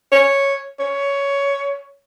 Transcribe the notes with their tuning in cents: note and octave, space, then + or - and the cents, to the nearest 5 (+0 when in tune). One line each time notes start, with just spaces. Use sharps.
C#5 -5
C#5 +15